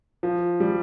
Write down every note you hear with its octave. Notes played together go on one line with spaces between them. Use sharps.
F3
G3